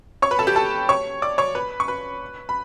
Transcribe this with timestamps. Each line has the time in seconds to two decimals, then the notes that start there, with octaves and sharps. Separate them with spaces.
0.22 C#5 C#6
0.31 B4 B5
0.39 A4 A5
0.47 G4 G5
0.56 A4 A5
0.89 C#5 C#6
1.22 D5 D6
1.38 C#5 C#6
1.55 B4 B5
1.80 C#6
1.88 B4 B5
2.49 B5